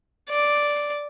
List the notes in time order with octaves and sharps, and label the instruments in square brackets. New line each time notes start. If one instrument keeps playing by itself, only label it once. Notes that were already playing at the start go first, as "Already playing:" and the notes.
[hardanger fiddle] D5